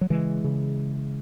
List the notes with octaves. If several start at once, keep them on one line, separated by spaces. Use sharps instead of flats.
F#3
C#3 E3 G#3
C#3